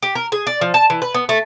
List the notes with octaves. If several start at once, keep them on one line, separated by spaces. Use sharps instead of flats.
G4
A#4
G#4
D5
F3
A5
E3
B4
B3
A3